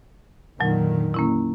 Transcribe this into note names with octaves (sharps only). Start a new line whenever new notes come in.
F2 A#2 D3 D#3 F#3
A#3 C#4 E4